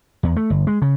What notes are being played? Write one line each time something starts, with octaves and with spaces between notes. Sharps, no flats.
E2
A3
G1
G#3
C#3